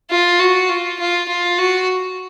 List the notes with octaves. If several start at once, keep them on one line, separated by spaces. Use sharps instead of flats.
F4
F#4
F4
F4
F4
F#4